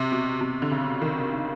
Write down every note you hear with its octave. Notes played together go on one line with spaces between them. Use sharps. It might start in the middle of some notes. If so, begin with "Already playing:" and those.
Already playing: C3
B2
C3
D3
C#3
D#3
C#3